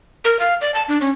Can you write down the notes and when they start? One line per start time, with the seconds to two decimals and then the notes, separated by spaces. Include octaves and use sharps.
0.25 A#4
0.39 F5
0.61 D5
0.74 A5
0.88 D4
1.01 C#4